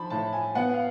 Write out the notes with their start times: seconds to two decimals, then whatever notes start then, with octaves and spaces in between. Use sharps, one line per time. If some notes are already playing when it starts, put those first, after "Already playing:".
Already playing: F3 A5 B5
0.10 A2 A5
0.33 G#5
0.55 B3 F#5
0.74 F5